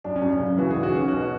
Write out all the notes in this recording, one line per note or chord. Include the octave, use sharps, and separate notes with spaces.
F#2 D4
C#4
F#2
D4
C#3
E3 F#4
G#4
B1
F#4
C#4 G#4
B2 F#4